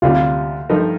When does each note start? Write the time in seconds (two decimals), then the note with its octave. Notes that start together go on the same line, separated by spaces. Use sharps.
0.02 D2 C3 G3 F4
0.69 G2 F3 A3 D#4 A#4